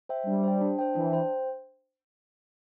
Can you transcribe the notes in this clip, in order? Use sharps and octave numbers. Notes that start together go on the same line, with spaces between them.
C5 E5 G5
G3 D4
C5 G5
D4
C5 G5
E3 D4
C5 G5